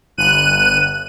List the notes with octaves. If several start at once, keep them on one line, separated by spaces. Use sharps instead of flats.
G1 F#6 D#7